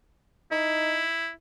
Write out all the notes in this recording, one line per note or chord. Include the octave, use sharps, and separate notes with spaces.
D#4 E4